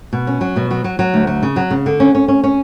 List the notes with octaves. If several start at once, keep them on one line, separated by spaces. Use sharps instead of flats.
B2
C#4
F#3
B2
F#3
F#3
F#3
D2
F#3
C#3
F#3
C#3
D3
C#4
C#4
C#4
C#4